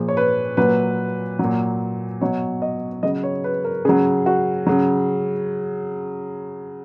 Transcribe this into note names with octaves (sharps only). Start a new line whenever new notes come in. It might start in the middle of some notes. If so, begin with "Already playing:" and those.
Already playing: A#2 F3 G#4
C#5
B4
A#2 F#3 B4
F#3
A#2
B2 F#3 C#5
D#5
C#3 F#3 D#5
C#5
B4
A#4
C#3 F#3 G#4
F#4
C#3 F#3